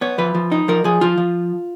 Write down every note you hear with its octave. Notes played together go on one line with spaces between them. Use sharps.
B3 C#5
F3 B4
F3
D#4
F3 A#4
F3 G#4
F3 F4
F3